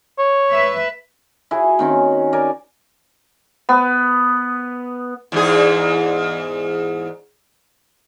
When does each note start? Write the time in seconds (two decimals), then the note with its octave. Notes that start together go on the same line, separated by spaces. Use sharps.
0.18 C#5
0.51 B4 E5
1.51 E4 F#4 G#4 G#5
1.79 D#3 C4 C#4
2.33 A#4 D5 G#5
3.69 B3
5.32 E2 G#2 G#4